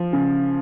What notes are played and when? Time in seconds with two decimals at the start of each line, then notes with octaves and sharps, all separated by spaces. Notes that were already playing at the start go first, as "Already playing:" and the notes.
Already playing: F3
0.13 C#3